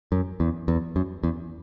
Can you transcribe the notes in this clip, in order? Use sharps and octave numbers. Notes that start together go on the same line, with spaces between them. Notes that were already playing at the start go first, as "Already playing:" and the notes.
F#2
E2
E2
F#2
E2